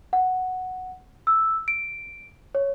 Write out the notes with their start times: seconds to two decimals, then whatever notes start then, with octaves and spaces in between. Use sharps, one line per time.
0.13 F#5
1.27 E6
1.68 D7
2.55 C#5